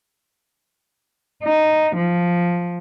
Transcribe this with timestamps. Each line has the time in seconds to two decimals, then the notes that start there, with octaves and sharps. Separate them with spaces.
1.44 D#4
1.96 F3